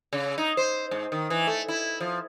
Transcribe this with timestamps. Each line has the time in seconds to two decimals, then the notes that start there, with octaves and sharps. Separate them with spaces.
0.13 C#3
0.38 D#4
0.57 C5
0.91 G#2
1.12 D#3
1.30 E3
1.47 A3
1.68 E4
2.00 F3